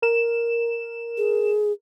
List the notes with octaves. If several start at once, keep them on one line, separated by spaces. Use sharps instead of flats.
A#4 E7
G#4